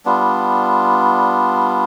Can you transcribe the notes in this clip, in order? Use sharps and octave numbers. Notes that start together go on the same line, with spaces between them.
G3 B3 D4 F4